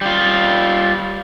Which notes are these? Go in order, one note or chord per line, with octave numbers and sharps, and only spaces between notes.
G3 F4